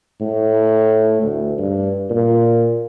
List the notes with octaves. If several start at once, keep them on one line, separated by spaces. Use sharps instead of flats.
A2
D2
G2
A#2